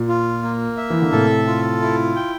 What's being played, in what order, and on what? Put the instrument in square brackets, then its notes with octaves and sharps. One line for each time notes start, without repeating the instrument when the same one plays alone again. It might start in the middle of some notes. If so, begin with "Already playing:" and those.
Already playing: [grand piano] A#2
[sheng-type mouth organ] F4
A#3
E5
[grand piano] E3
D3
[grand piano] A2 C3 [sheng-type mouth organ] A4
[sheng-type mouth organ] F4
E4
G5